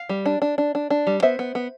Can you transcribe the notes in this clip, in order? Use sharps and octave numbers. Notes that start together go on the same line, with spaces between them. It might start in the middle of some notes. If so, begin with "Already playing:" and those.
Already playing: F5
G3
D4
D4
D4
D4
D4
G3
B3 C5 E5
B3
B3